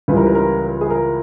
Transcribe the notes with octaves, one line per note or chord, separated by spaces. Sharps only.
C#2 C#3 E3 G3 B4
A#4
B4
A#4
G#4
A#4